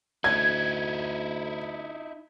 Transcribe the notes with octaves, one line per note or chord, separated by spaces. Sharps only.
D2 D#4 E4 G#6